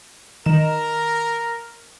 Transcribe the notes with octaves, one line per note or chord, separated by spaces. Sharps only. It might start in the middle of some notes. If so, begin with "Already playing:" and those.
D#3 A#4 E7